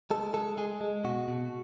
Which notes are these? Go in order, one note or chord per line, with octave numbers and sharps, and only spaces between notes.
G#3 A4
G#3 A4
G#3 G#4
G#3
B2 F#4
B2